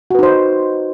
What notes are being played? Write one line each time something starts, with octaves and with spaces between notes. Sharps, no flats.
D#4 F#4 B4 C5